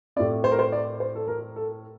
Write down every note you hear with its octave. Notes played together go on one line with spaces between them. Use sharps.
A2 A3 C4 D5
C5
A#4
C5
D5
C5
A4
A#4
A4